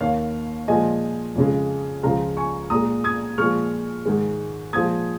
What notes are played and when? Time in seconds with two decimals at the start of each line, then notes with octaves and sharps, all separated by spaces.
0.01 D#2 D#3 A#3 C#5 F5
0.68 A#2 F3 G#3 D#5 G#5
1.35 F2 C#3 G#3
2.03 C#2 C#3 F3 G#3 F5 A#5
2.37 G#5 C#6
2.70 A#2 G#3 A#5 D#6
3.04 D#6 G#6
3.38 A#2 F3 G#3 C#6 F6
4.05 G#2 D#3 G#3
4.73 A#2 F3 G#3 D#6 G#6